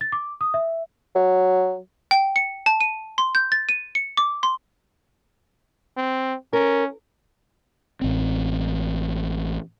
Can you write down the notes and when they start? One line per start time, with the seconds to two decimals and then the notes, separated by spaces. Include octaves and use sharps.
0.01 A6
0.12 D6
0.41 D#6
0.54 E5
1.15 F#3
2.11 G5
2.36 C#7
2.66 A5
2.81 D#7
3.18 C6
3.35 G6
3.52 A6
3.69 D#7
3.95 C#7
4.17 D6
4.43 C6
5.97 C4
6.53 C#4 A#4
8.01 A1 C4